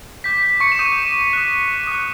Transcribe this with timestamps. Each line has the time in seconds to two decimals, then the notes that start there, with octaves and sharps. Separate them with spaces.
0.24 D6 G6 B6
0.43 B6
0.60 C#6 C#7
0.72 E7
0.79 D6 D#6 G6 D#7
1.33 D#6 F#6
1.87 D#6 F#6